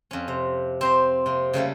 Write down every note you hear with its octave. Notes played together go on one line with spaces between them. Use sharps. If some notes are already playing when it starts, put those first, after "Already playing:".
F2 C#4
C3
C4 C5 A#5
C3 A#3
C#3 G3 A3 A#3